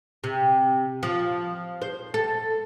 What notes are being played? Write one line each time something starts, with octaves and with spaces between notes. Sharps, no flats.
C3
F3
C5
A4